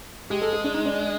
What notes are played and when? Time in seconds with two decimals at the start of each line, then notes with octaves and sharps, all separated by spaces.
0.30 G#3 G4
0.42 A4
0.53 G#4
0.64 D4
0.74 D#4
0.86 D4